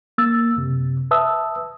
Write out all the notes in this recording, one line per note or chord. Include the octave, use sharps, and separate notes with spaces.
A#3 E6 A6
F#2 C3
B4 E5 A5 D#6 E6